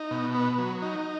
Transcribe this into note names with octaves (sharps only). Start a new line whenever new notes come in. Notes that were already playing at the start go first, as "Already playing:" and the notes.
Already playing: D#4
B2
B3
F#3
D#4